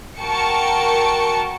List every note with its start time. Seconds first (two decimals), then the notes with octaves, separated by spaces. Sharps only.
0.20 F#4 A#4 G5 A5 C#6 C#7